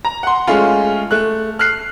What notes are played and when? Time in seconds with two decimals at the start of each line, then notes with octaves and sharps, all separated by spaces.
0.05 A#5
0.23 F#5 C6
0.47 G#3 A3 C#4 F4
1.11 A3 F#6
1.59 F6 F#6 C7